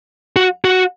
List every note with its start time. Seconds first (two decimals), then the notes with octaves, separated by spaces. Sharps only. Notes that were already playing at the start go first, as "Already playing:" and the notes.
0.36 F#4
0.65 F#4